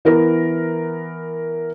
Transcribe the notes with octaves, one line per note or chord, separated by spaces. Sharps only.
E3 B3 E4 A#4